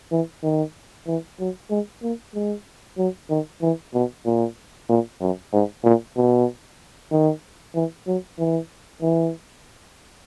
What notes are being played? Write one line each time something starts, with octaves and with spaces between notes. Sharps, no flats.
E3
D#3
E3
F#3
G#3
A#3
G#3
F#3
D#3
E3
B2
A#2
A#2
F#2
G#2
A#2
B2
D#3
E3
F#3
E3
E3